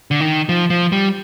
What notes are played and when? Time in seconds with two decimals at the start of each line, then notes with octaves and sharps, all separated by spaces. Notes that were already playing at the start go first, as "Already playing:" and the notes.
0.11 D3
0.20 D#3
0.49 F3
0.70 F3
0.92 G3